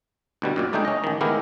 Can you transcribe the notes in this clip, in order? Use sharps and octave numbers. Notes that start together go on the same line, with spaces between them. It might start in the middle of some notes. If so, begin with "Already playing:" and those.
D2 B2 G3
F#2 A#2 D5
C#2 A3 D4 D#4 G#4 G5
C#4 D#5
A1 D#3
D#3 G#3 B3 E4 G4 A#4